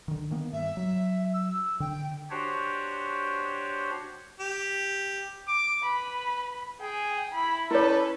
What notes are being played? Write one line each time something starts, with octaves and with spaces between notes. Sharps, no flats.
D3 D#3
D#3 A#3 B3
G2 E5
F#3
E6
D3 G5
D4 F#4 G4 C5 C#5
G4
D6
B4 B5
G#4 G5
E4 B5
C#4 E4 A4 B4 C#5